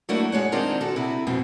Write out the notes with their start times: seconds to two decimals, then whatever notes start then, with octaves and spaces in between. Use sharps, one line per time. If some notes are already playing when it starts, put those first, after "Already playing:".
0.09 F#3 A3 A#3 D4 E4 F#4
0.32 F#2 G#3 C#5 F#5
0.52 D#3 G#3 C4 D4 D#4 F4
0.81 F#4 A4
0.96 C3 E4
1.27 F2 G#2 B2 C4